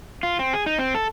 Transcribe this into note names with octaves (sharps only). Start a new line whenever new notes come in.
F4
C4
G#4
D#4
C4
A4